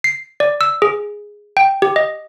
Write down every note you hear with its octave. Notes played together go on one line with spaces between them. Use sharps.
C7
D5
E6
G#4
G5
G4
D#5